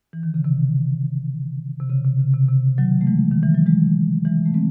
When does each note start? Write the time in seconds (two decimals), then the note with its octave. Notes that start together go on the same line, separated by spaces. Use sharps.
0.13 E3
0.23 D#3
0.34 C#3
0.44 C3 D#3
1.80 C3
1.89 C#3
2.04 C3
2.19 C#3
2.34 C3
2.48 C3
2.78 D#3 F#3
3.01 A3
3.07 E3 G#3
3.31 D#3
3.43 E3
3.55 F#3
3.66 E3 G#3
4.25 E3 G#3
4.45 A3
4.54 G#3 C4